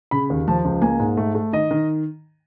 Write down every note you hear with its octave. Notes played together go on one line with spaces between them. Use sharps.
C#3 B5
D#2
F3 A5
C#2
A#3 G#5
G#2
A3
A3
D#3 D#5
D#3